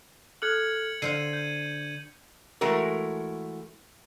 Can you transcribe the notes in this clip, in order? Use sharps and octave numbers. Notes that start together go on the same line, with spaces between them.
A4 F6 F#6 G#6 C#7 F#7
D3 C5 F5 C7 D#7
G6
E3 G#3 A3 F#4 A#4